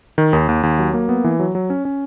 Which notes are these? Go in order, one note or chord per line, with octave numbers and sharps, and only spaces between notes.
D#3
D#2
D#2
D#2
F#3
A#3
B3
E3
F#3
F#3
C#4
C#4